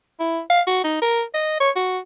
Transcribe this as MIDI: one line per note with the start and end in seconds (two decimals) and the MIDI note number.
0.19 0.40 64
0.50 0.61 77
0.67 0.83 66
0.84 0.98 63
1.02 1.23 70
1.34 1.58 75
1.61 1.70 73
1.76 1.98 66